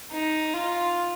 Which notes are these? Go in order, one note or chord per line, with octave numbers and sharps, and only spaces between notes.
D#4
F4